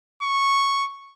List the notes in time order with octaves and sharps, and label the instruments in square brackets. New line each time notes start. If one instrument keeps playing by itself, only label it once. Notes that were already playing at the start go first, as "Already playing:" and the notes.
[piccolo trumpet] C#6